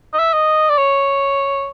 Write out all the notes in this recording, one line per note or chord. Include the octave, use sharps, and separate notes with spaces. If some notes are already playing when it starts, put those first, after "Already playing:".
D#5
E5
D#5
D5
C#5